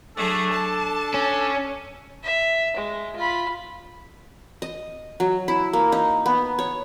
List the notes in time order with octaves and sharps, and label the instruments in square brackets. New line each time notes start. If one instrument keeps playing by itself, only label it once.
[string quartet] F#3 A3 G#4 [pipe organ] D4 A4
[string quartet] A5
[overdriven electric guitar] C#4
[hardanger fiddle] E5
G#3
F4 B5
[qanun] D#5
F#3
E4
A#3
D#4
B3
C#5